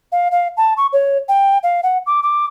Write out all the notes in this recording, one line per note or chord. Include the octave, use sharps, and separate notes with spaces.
F5
F5
A5
C#6
C#5
G5
F5
F#5
D6
D6